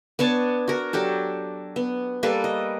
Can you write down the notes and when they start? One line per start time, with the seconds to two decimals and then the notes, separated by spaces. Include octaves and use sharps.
0.19 B3 D4 C#5 A5
0.68 F#4 A#4
0.93 F#3 D4 G4 A4
1.76 B3
2.23 G3 A#3 A4 B4
2.44 D#5